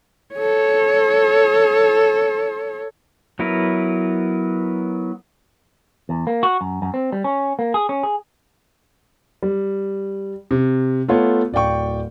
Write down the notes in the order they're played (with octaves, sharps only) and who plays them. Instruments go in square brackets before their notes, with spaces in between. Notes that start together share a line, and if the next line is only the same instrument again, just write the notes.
[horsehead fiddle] A4 C#5
[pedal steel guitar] F#3 B3 E4 A#4 B4
[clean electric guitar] E2
A#3
F#4
F#2
F#2
C4
G3
C#4
A#3
G#4
C#4
G#4
[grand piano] G3
C3
A3 B3 F4 A4 C#5
D1 D5 F5 G5 C#6